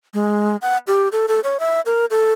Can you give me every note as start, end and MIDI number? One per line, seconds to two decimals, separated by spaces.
0.14 0.56 56
0.62 0.78 78
0.87 1.08 67
1.12 1.26 69
1.28 1.40 69
1.44 1.58 73
1.60 1.81 76
1.86 2.06 70
2.10 2.33 69